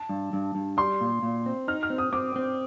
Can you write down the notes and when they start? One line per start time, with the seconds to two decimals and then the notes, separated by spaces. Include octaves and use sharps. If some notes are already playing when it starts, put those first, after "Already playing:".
Already playing: A5
0.09 G2
0.33 G2
0.55 G2
0.77 G3 C6
1.01 A#2
1.23 A#2
1.46 C4
1.68 D#4 F6
1.83 F6
1.90 C4
1.98 D#6
2.13 C4 D6
2.36 C4